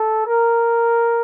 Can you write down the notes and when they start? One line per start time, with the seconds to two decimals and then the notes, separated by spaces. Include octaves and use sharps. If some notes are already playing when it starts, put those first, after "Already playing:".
Already playing: A4
0.27 A#4